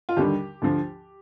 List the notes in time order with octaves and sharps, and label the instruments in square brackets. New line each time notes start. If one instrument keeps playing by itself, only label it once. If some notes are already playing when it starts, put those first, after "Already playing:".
[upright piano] F4
D#2 D3 G3 G4
D2 D3 F3